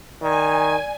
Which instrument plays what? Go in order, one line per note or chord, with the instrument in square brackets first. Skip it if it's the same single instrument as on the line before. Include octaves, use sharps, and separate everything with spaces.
[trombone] D#3 [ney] D5 [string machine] G#5